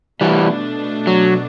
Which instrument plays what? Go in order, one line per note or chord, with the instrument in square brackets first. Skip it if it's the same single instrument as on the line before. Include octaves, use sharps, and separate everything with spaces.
[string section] B2 A3 D4 [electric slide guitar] E3 G3
[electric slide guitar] F#3